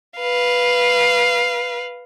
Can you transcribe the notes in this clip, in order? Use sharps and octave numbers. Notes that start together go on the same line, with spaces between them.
B4 F5